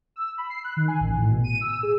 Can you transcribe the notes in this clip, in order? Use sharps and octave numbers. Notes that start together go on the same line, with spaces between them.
E6
B5
C7
F#6
D#3
G#5
A1
A2
B2
D#7
E6
G#4